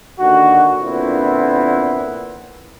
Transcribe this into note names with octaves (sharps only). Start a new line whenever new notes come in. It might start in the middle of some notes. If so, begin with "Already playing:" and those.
D#2 D3 F#4
A#2 D3 B3 C4 E4